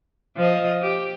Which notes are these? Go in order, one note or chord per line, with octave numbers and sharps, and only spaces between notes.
F3 D#5
G4